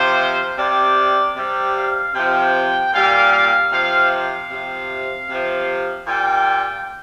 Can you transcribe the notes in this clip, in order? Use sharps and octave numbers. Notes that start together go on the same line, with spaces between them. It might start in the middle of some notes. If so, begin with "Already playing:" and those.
Already playing: C3 F3 C5
C3 G3 D5
C3 G3 D5
F5
C3 F3 G5
A#2 G3 F5
F5
C3 F3 F5
F5
C3 F3
C3 F3
A#2 G3 G5